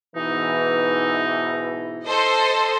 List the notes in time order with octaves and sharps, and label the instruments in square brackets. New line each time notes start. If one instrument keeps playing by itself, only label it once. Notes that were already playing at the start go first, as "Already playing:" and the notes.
[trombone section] G#2 B2 E3 [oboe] D#4
[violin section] A4 C5 D#5